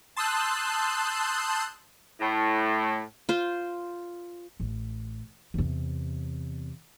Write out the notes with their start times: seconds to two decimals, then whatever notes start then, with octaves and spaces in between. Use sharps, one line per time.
0.16 A5 C6 D#6 E6 F#6 G6
2.21 A2
3.29 F4 C5
4.60 A1
5.54 E2 C3